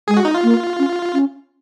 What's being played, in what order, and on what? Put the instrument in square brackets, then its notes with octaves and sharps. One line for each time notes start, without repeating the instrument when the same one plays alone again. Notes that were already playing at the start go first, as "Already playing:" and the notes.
[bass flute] G#3 [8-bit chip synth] G#4
[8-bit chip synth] F#4
D#4
F4
[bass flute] A#3
C#4
C#4